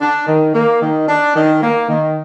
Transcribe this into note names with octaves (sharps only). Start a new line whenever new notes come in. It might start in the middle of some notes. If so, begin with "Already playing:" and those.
D4
D#3
A#3
D#3
D4
D#3
A#3
D#3